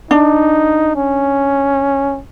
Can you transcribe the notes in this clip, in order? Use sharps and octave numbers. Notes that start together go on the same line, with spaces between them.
D4 D#4
C#4